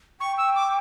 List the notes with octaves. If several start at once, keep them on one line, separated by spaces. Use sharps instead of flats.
G5 C#6
E6
D6